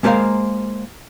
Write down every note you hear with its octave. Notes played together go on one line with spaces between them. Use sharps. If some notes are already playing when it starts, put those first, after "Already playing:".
G#3 A#3 B3 A#4 C5 F5